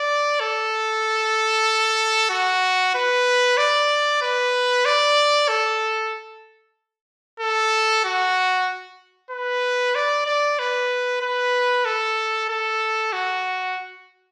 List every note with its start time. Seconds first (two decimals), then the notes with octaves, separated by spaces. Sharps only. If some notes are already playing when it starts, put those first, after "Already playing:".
Already playing: D5
0.40 A4
2.30 F#4
2.95 B4
3.57 D5
4.22 B4
4.86 D5
5.48 A4
7.40 A4
8.04 F#4
9.31 B4
9.95 D5
10.26 D5
10.59 B4
11.22 B4
11.85 A4
12.49 A4
13.13 F#4